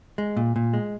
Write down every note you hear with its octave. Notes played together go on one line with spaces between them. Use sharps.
G#3
A#2
A#2
G#3